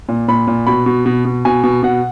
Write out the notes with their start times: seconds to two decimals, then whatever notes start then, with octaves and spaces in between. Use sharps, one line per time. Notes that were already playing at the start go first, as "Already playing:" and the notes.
0.09 A#2
0.28 A#2 B5
0.47 A#2
0.67 B2 B5
0.86 B2
1.06 B2
1.25 B2
1.45 B2 G#5
1.64 B2
1.83 B2 F#5